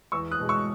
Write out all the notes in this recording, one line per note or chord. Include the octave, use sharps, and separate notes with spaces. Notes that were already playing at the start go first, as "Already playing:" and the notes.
E2 C#6 E6
D#6 F#6
B2 G#3
C#6 E6